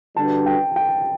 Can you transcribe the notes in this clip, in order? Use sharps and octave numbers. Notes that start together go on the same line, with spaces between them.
D3 G3 D4 F#4 B4 A5
G5
G5